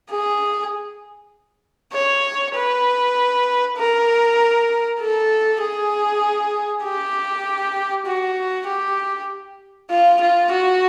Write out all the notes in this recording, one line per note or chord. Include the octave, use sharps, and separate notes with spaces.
G#4
C#5
B4
A#4
A4
G#4
G4
F#4
G4
F4
F4
F#4